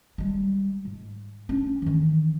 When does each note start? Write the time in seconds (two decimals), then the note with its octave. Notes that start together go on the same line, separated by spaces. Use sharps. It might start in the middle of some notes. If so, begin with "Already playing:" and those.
0.18 G3 G#3
0.85 G#2
1.49 C#4 D4
1.82 D#3 E3